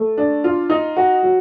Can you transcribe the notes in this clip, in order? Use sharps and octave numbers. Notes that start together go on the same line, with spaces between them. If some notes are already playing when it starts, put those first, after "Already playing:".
Already playing: A3
D4
F4
D#4
F#4
F#3